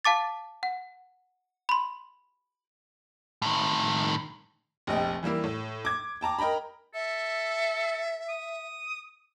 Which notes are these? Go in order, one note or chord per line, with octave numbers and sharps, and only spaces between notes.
F5 A5 D6 A6
F#5
B5 C6
A2 D#3
F1 A#1 D#5 G5
E3 G3 A#3 E4
A2
D6 G#6
G5 A5 A#5 D6
A#4 D#5 G5 A#5 B5
A4 E5
D#6